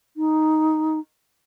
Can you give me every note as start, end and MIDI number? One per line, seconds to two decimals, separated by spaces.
0.17 0.99 63